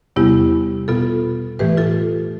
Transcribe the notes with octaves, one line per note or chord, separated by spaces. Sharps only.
E2 C3 G3 B3 E4 G4
B2 B3 F4 A4
A2 E3 A3 G4 B4
F4 A4